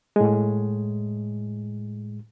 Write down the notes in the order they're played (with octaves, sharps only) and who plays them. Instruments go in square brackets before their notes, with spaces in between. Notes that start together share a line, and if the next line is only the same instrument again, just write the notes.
[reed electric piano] A2 G#3